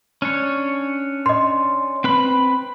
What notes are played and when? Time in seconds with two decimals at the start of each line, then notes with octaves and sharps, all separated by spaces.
0.22 C#4 D4 C#5
1.26 D#5 C6
2.04 C4 B4 B5